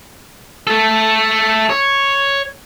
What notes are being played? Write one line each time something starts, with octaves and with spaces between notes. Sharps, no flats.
A3 A4
C#5